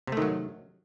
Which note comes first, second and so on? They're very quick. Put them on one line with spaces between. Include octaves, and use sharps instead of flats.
C3 A3 D#3 F#3